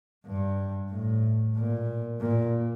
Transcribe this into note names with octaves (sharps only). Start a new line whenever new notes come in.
G2
A2
A#2
A#2